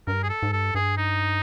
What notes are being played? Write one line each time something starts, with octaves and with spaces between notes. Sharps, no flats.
G2 A#4
G#4
A4
G#2
G2 A4
G2 G#4
D#4